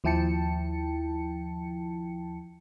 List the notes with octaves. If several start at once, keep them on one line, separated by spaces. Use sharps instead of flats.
D#2 F3 E4 G5 A5 C#7